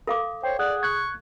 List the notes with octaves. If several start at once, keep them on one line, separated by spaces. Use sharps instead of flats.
A4 F5 D6
C5 C#5 G5
G#4 D5 F#5 F#6
C2 C#6 F#6 G#6